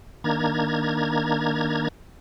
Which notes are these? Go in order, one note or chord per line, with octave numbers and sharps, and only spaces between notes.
D#3 A#3 D4 A#5 G#6